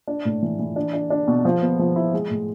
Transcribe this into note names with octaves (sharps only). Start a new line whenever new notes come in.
D4
A2
E3
E3
D4
D4
D4
B2
F3
B3
F3
E4
G#3
A2